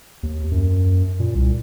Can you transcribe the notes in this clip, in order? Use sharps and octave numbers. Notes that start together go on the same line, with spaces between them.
D#2
F#2
A#2
C2